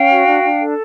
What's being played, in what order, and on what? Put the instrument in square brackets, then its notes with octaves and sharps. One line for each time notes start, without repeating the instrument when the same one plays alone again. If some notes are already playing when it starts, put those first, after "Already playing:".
Already playing: [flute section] C#4 F5 G5
F#4
D4
D4
A4